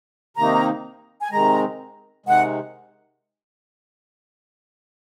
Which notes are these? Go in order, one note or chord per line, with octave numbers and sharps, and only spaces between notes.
C3 D#3 A#3 D#4 A#5
G#5
C3 D#3 G#3 A#5
C3 D#3 G#3 F#5